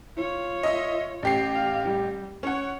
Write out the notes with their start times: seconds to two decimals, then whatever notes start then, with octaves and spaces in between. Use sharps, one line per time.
0.17 F4 C#5
0.63 D#5 E5
1.23 A1 G4 C7
1.54 F5
1.84 G3
2.43 C#4 C#5 F#5